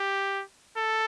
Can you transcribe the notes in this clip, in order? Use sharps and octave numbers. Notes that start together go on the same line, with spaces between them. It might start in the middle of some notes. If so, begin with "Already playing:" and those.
Already playing: G4
A4